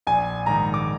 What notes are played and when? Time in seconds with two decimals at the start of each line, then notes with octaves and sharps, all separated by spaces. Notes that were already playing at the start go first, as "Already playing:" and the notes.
0.07 A#1 G#5
0.46 G#2 D#3 A#5
0.74 D6